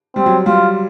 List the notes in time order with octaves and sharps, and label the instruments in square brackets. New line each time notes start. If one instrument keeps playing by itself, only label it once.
[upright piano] G3 [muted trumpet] C4
[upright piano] F#3
[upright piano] G3 [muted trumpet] F4